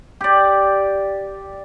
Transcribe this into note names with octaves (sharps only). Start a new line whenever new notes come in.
G4 D5